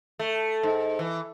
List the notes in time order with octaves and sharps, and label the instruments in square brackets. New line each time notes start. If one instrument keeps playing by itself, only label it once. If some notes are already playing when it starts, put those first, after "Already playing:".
[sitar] A3
G#2
E3